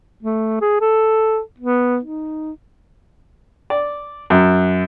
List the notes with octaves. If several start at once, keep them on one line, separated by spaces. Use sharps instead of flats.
A3
G#4
A4
B3
D#4
D5
F#2